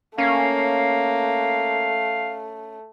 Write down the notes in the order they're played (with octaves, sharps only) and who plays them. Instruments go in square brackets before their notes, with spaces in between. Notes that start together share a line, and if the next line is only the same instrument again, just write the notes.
[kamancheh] A3 [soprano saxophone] A#3 [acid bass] C#4 [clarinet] F5